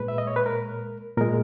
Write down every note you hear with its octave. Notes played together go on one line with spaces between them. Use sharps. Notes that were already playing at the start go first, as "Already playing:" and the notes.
Already playing: A#2 G#3 B4
E5
D#5
C#5
B4
A#4
A#2 G#3 A#4